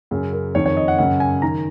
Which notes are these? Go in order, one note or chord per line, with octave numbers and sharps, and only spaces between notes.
F#2 C#3 G#4
A#4
F2 D#3 C#5
C#5
D#5
F#5
F#2 C#3 F#5
G#5
D#3 A#5